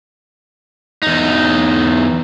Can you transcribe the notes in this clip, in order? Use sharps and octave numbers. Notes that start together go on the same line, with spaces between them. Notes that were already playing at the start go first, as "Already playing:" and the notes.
E2 D#4